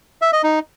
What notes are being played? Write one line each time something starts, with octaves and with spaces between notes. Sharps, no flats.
E5
D#5
D#4